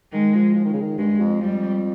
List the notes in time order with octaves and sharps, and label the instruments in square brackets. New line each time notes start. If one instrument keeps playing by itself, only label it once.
[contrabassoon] D#3 [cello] G#3
[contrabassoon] F3
F3
D#3
C#3
D#3
[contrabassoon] G2 [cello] G#3
[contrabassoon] F2
[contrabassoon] F2 [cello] G3